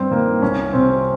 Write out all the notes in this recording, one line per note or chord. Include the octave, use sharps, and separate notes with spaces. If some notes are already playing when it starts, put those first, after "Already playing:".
Already playing: G2 C4
D#3 A#3
C2 C#4
C3 C4